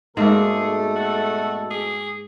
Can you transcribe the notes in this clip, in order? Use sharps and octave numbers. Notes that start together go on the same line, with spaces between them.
G#2 B2 A3 A#3 G#4 A4
F#4
G#4